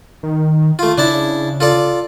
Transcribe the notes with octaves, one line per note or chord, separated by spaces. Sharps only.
D#3
A3 F4
C#3 D4 E4 A5
F4 A4 D5